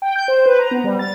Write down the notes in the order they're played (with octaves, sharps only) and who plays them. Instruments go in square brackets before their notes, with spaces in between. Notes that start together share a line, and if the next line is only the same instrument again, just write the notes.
[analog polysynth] G5
G6
C5
B4
A#5
B3
G3
A6